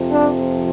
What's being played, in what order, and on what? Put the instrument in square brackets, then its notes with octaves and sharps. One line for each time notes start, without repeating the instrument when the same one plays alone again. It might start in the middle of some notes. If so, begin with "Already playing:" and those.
Already playing: [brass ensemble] F2 C3 F3
D4